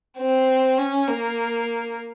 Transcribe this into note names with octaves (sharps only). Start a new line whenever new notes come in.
C4
C#4
A#3